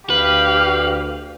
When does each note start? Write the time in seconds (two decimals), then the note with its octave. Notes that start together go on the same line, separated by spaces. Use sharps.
0.10 D2 G4 B4 F5